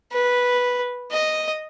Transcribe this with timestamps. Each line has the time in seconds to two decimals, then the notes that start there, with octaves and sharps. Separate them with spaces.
0.12 B4
1.11 D#5